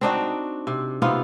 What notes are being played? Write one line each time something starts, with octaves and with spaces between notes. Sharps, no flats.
C4 D4 D#4 F#4
C3
C3 B3 D#4 F4